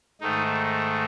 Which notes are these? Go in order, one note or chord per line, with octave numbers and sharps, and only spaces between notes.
G#2 D#3 A3 D#4